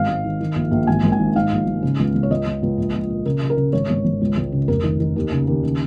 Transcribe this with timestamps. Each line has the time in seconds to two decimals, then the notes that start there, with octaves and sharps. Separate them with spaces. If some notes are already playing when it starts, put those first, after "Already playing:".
Already playing: G#1 F5
0.09 G#2
0.24 D#3
0.41 D#3
0.56 A#1
0.71 A#1
0.87 G#1 G#5
1.03 G#1
1.12 G#5
1.19 D#3
1.36 G#2 F5
1.52 A#1
1.67 G#2
1.83 C#3
1.99 C#2
2.15 C#2
2.23 C#5
2.30 C#2 D#5
2.46 C#2
2.62 C#2
2.78 A#1
2.94 A#1
3.10 A#2
3.26 C#3 A#4
3.42 C#3
3.50 A#4
3.57 C#3
3.73 G#1 C#5
3.89 G#1
4.04 G#1
4.21 C#2
4.37 C#2
4.52 C#3
4.68 F1 A#4
4.84 D#3
5.00 D#3
5.16 D#2
5.32 C#3
5.48 D#2
5.63 C#3